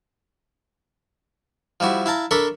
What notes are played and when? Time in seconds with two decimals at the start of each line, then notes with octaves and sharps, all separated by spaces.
1.80 F3 G3 E4 F#4
2.06 E4 F5 A5 A#5
2.31 D4 A4 A#4 E5 B5 C#6